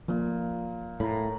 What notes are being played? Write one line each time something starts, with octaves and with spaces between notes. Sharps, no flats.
A#2 F3 A#3
A2 A#5 B5